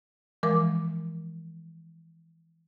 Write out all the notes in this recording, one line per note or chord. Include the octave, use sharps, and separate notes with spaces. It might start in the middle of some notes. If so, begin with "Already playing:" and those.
E3 F3 G#3 A#4 D6